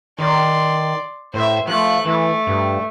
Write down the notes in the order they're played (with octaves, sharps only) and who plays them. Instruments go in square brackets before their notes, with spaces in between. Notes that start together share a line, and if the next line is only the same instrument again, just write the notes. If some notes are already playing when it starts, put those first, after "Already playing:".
[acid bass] D#3 [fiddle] D5 C6
[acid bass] A2 [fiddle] C5 E5
[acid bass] F3 [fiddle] A3 F#6
[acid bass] E3 [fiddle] A3
[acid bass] G2